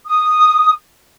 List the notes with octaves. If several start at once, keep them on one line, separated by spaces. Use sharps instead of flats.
D#6